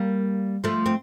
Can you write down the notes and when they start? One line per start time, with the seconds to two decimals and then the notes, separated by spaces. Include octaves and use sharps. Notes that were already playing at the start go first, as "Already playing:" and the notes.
Already playing: G3 A#3
0.64 F3 A3
0.86 C4